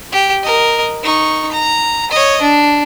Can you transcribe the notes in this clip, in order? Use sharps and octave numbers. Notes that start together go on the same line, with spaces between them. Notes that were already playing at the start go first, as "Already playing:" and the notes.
G4
A#4 D#5
D#4 C#6
A#5
C#5 D#5
D4